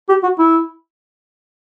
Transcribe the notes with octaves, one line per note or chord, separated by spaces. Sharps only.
G4
F#4
E4